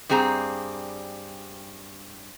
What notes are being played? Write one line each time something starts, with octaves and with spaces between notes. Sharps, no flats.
G2 G3 C4 G#4 A#5